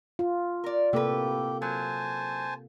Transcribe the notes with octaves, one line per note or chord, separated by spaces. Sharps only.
F4
A#4 D5
A2 C3 A#3 G4 A4 B4
F#3 C5 G#5 A5